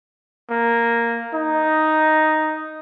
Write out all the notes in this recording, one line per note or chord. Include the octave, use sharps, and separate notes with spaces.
A#3
D#4